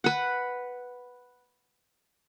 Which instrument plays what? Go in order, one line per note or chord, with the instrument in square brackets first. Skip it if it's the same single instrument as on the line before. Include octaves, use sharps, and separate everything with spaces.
[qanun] B4 F#5